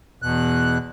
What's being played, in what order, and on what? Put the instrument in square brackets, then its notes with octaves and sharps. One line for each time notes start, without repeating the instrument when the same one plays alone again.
[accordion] E2 B2 F#6